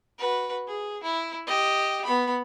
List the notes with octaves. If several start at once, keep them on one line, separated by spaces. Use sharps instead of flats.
F#4 B4
G#4
E4
G4 D#5
B3 B5